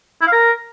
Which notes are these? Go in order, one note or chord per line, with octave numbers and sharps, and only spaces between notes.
E4
F5
A#4